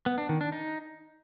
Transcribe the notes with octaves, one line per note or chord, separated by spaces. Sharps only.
B3
D4
D#3
D4
D#4